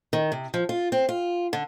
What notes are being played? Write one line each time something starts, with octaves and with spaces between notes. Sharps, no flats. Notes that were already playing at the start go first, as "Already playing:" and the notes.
D#3
C3
F3
F4
C4
F4
D3